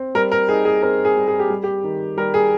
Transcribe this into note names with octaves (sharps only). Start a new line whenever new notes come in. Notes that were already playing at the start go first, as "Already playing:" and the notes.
Already playing: C4
G3 A#4
A#4
D#4 G#4
G#4
C4 A#4
G#4
G3
G#4
G4
G3
G4
D#3
G3 A#4
G#4